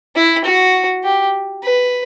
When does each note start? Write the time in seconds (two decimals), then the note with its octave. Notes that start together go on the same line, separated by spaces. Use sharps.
0.16 E4
0.45 F#4
1.04 G4
1.63 B4